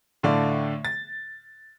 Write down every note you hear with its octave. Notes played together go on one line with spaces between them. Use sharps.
A2 D3 A3 D5 F5
A6